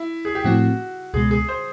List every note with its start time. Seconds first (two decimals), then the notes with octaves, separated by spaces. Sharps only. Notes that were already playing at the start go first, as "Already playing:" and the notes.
Already playing: E4
0.25 G#4
0.35 G4
0.44 A2 F3 A3 C4 E4 F#4
1.14 C#2 B2 G#3 G#4
1.31 G#4
1.48 C5